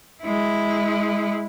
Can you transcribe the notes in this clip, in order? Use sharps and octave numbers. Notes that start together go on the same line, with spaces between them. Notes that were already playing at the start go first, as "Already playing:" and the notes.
G#3 E4